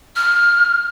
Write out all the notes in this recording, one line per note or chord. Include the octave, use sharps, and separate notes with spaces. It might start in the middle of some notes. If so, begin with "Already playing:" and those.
F6